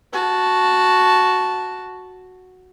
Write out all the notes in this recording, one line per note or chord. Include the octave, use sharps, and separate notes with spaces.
F#4 A5